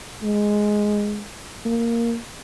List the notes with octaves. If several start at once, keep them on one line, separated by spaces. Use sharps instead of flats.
G#3
A#3